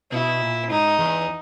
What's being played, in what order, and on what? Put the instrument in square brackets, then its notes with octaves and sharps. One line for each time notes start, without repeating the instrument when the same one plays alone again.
[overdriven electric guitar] B2 [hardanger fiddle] E4
[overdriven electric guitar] A#2
[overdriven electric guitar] G#2 [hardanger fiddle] D#4
[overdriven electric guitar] E2